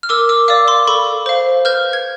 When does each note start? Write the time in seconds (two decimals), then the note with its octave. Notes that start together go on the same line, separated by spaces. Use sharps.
0.03 F6
0.09 A#4 D6 E6
0.29 D6 E6
0.48 D5 F5 D6 E6
0.68 C6 D6
0.87 A4 B5 C#6
1.26 C5 F5
1.65 B4 F6 G6
1.93 G#6